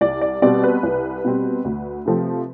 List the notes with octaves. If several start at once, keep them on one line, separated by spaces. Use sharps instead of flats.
C2 D5
D5
B2 G3 C4 D5
B4
C2
B2 G3 C4
D2
C3 F3 A3 C4